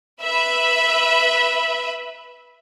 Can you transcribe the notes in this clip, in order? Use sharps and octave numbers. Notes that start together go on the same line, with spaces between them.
B4 E5 B5